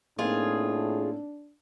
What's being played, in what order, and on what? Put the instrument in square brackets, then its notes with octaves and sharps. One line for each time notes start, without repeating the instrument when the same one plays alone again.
[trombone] A2 [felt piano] A#3 C4 D#4 [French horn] D4 [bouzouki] F4 G#4